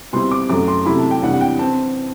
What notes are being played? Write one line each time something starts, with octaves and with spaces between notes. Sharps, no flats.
B2 G3 C4 E4 C6
D6
F#2 F#3 A3 D6
C6
C3 F#3 A3 E4 B5
A5
G5
E2 C3 G3 D4 F#5
F#5
G5
C4 A5